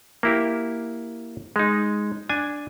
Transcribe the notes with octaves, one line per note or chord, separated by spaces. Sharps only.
A#3 E4 G4
G#3 D#4
D4 G#5